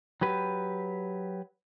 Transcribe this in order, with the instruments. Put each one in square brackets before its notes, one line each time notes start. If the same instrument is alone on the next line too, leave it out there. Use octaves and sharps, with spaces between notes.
[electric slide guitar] F#3 G4 B4